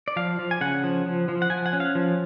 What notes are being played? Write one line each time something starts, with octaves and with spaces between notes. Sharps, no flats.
D5
F3 F5
F3
G#5
C#3 F#5
F3
F3
F3
F#5
F3 G#5
F#5
C#4
F5
F3